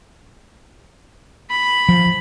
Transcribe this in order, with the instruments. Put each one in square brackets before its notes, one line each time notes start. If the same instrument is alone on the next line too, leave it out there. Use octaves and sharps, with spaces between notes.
[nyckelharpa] B5
[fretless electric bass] F3